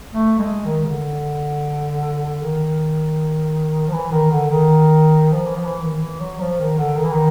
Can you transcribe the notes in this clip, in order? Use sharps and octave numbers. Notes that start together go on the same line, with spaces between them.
A3
G#3
D#3
C#3
D3
D#3
F3
E3
D#3
D3
D#3
F3
E3
F3
E3
D#3
E3
F#3
F3
D#3
D3
D#3
E3
D#3